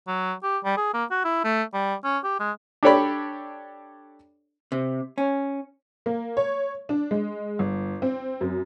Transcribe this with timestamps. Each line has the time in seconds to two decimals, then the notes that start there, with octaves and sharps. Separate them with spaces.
0.08 F#3
0.43 G4
0.64 G3
0.77 G#4
0.94 A#3
1.11 F#4
1.25 E4
1.44 A3
1.74 G3
2.04 C#4
2.24 G4
2.40 G#3
2.83 D4 G4 A4 C#5 D5 B5
4.72 C3
5.18 C#4
6.06 A#3
6.37 C#5
6.89 D4
7.11 G#3
7.59 G1
8.02 C4
8.41 F#2